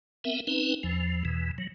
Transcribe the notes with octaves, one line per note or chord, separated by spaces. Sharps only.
B3 C4 A#4 E5
C4 C#4 D#4 B4
E2 F3
E2 B2 E3
F#3